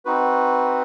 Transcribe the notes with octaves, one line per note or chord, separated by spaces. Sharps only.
C4 D#4 F#4 B4